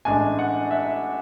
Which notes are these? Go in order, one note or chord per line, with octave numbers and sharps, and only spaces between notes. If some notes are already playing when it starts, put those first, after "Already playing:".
A1 A2 G#3 D4 G#5
F#5
E5